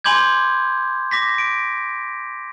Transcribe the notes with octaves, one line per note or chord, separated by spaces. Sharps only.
G#5 B5 C6 D6 G6 G#6
D6 A#6 B6
D7